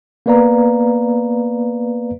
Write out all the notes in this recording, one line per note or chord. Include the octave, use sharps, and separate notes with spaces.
A#3 B3 B4 D5 F5 A#5